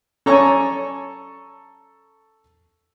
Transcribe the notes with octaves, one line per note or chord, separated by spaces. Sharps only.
C#4 A4 D5 G#5 A#5 C#6